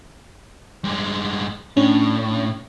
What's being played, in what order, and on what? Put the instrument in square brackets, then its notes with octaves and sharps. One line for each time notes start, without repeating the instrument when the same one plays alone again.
[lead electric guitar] G2 G#3
[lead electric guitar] A2 [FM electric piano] C#4 D4